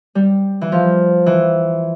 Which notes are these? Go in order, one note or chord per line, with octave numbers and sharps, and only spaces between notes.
G3
E3
F3
E3